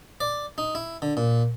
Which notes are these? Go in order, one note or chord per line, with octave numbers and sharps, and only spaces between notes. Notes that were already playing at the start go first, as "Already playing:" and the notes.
D5
D#4
E4
D3
A#2